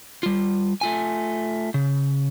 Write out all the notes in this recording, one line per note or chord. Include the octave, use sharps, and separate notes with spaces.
G3 F4
A3 F4 G#5
C#3